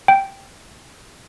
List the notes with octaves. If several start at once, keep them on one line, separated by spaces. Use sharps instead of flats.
G5